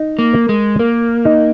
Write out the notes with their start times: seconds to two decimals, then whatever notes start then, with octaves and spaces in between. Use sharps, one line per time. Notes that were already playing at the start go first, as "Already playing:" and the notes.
Already playing: D#4
0.19 A#3
0.33 A#4
0.49 G#3
0.79 A#3 A#4
1.25 D#4